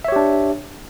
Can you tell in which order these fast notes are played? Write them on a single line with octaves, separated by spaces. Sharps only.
E5 C#5 G4 D4